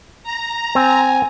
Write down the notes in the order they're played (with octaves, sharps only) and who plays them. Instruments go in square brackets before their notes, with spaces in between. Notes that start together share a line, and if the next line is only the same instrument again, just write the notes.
[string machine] A#5
[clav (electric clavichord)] C4 [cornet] G#5